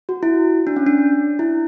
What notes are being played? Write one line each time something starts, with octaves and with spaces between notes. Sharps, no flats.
F#4
E4
D4
C#4
D4
E4